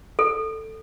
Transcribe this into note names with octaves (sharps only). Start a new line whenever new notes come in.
A4